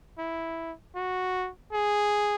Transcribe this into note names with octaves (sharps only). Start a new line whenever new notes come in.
E4
F#4
G#4